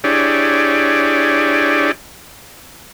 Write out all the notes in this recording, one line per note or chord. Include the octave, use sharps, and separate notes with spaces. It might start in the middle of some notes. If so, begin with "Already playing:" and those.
D4 E4 G4 G#4 C#5 D5